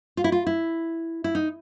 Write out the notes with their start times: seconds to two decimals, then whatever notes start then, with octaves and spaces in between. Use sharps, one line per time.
0.17 F4
0.24 E4
0.32 F4
0.47 E4
1.24 E4
1.35 D#4